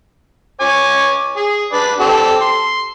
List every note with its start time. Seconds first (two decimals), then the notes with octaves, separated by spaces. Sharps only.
0.61 C#5 G#5 D6
1.36 G#4
1.73 D4 B4 D5
2.00 C4 G4 A4
2.41 C6